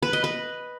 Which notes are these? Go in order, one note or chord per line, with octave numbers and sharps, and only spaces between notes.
B4
D#5
B4